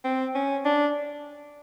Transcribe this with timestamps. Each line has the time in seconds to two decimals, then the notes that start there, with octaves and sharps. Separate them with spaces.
0.04 C4
0.35 C#4
0.65 D4